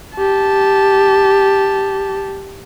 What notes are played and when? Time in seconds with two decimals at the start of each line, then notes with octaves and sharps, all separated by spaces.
0.17 G4 A5